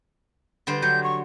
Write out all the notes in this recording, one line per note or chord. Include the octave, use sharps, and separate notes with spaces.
D3 G3 C5
F#3 G6
C#6